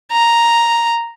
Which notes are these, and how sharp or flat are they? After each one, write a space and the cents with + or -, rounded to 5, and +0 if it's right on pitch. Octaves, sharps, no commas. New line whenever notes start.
A#5 +0